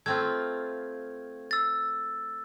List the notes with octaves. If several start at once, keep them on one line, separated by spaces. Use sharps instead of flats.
A3 C4 F4 G#6
E6 A6